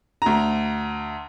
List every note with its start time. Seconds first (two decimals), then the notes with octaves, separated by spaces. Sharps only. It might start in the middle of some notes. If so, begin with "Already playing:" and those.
0.22 D2 A#5